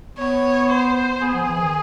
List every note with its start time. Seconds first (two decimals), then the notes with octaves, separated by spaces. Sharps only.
0.18 B3 C#5
0.70 C5
1.21 B3 G#4
1.34 F3
1.47 E3
1.60 D#3